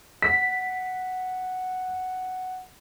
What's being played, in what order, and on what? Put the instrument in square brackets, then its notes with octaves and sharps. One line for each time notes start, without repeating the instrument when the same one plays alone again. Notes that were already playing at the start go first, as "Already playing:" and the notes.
[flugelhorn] F#5 [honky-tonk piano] B6